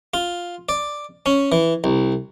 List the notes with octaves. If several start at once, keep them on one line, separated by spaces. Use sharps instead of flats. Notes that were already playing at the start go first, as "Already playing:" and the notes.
F4
D5
C#4
E3
C2